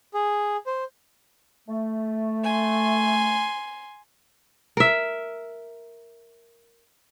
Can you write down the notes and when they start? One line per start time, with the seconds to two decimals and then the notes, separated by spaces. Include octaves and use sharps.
0.14 G#4
0.66 C5
1.69 A3
2.44 G#5 C6
4.77 A#4 E5